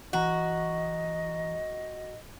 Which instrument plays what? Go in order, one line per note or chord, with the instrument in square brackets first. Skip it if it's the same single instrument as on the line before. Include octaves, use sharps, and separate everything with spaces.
[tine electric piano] G1 E3 A#5 [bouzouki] F#4 [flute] D#5